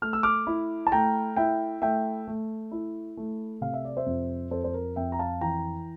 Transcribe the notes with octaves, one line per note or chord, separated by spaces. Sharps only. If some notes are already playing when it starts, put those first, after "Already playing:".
A3 F6
E6
D6 F6
E4
A5
A3 G5 A#5
E4 E5 G5
A3 E5 G5
A3
E4
A3
C3 F5
E5
D5
C5 E5
F2
F2 A4 C5
C5
A#4
F2 E5 G5
A#5
F5 A5
E3 G5 A#5